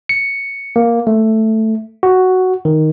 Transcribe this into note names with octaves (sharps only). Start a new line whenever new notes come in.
C#7
A#3
A3
F#4
D#3